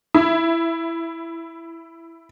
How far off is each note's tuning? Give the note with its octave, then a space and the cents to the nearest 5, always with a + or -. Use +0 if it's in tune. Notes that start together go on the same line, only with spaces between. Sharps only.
E4 +5